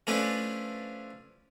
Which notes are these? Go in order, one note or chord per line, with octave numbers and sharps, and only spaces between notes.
F3 A3 C#4 D4 E4 B4